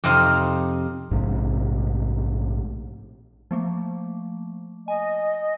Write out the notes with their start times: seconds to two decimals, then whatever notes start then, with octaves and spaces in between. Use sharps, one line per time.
0.04 F2 C3 D#4 C5 F5
1.11 A#1 G#2 C3
3.51 F3 A3 A#3
4.88 D#5 G#5